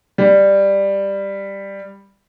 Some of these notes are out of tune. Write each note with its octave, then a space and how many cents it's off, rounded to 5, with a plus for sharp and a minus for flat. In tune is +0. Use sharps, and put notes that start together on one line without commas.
G3 +10